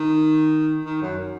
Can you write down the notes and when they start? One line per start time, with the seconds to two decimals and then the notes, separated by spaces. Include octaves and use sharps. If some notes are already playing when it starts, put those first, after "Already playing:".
Already playing: D#3
0.85 D#3
1.02 F#2